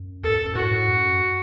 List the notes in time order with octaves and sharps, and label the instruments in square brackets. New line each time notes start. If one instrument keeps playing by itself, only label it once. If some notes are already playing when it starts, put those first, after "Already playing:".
Already playing: [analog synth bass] F#2
[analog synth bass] E2 [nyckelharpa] A4
[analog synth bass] A2
F#2
F#2
[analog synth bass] A2 [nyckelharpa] F#4
[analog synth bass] A2
F#2